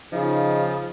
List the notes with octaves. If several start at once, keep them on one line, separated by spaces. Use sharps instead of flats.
C#3 F3 D#4